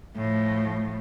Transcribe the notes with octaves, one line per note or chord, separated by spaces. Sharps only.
A2 F3